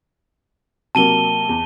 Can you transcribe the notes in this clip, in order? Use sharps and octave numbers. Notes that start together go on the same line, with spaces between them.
C3 F#3 A#3 A5 D#7 G7
E2